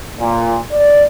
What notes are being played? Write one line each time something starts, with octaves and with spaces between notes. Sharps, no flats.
A#2
D5